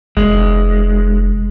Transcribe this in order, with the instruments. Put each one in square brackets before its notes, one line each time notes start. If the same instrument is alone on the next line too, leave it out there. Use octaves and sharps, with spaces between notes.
[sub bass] F1 [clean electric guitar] G#3